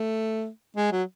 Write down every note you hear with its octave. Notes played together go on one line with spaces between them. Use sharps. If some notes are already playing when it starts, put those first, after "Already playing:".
Already playing: A3
G#3
F#3